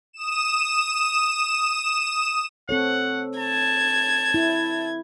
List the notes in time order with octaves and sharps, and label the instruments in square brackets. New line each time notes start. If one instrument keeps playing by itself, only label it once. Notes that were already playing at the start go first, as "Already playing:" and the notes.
[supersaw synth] D#6 E7
[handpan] C4 A4 C#5 [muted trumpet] F#5
[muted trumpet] A5 [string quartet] G#6
[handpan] E4